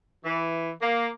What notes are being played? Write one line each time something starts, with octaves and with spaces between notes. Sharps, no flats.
E3
A#3